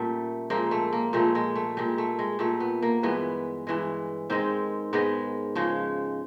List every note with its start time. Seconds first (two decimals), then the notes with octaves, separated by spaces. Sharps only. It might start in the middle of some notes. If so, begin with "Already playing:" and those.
Already playing: A#2 G3 A3 C#4
0.50 A#2 F3 G#3 A#3
0.71 A3
0.93 A#3
1.13 A#2 F3 G#3 A3
1.35 G#3
1.55 A3
1.77 A#2 G3 G#3
1.98 A3
2.19 G#3
2.39 A#2 G3 A3
2.60 B3
2.83 A#3
3.03 G2 E3 G#3 B3
3.67 G2 E3 G#3
4.30 G#2 D#3 G#3 C4
4.93 G#2 D#3 G#3 B3
5.55 C#3 F3 G#3